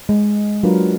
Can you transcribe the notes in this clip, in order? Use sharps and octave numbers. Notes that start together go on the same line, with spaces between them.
G#3
F#3 D4 F4 A#4 B4